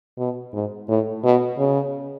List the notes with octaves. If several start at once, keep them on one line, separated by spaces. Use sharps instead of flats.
B2
G#2
A2
B2
C#3